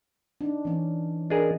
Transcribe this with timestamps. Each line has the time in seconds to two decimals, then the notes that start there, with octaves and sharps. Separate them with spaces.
0.41 D4 D#4
0.65 E3 C#4
1.30 D4 G#4 A#4 D#5